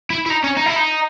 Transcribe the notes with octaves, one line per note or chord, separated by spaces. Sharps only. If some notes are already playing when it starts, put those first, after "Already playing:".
E4
E4
D#4
C#4
D#4
E4
D#4